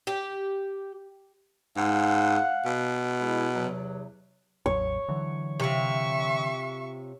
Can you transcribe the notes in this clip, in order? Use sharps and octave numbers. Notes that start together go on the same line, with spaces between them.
G4
G#2 F5 F#5
B2
G#3 E4
E2 C3 F#3
A1 E2 F#3 C#5
D3 E3 F#3
C3 F4 E5 C#6